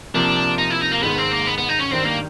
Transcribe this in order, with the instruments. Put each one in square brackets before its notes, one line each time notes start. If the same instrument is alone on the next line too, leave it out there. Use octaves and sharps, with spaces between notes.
[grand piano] C3 F3 A#3 [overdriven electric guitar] D4
[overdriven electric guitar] D#4
E4
D#4
A#3
[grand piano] G#2 D#3 G#3 [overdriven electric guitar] B3
[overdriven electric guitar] C4
A#3
B3
B3
D#4
C#4
[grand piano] G2 D#3 G3 [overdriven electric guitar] C4
[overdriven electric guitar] A#3